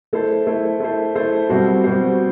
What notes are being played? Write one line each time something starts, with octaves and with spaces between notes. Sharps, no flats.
A3 E4 A4 C5
A3 E4 A4 C5
A3 E4 A4 C5
A3 E4 A4 C5
B2 G3 C4 F#4 C5
B2 G3 C4 F#4 C5